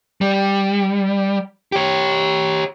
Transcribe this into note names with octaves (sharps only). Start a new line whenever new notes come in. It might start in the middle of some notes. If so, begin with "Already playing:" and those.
G3
G4 C#5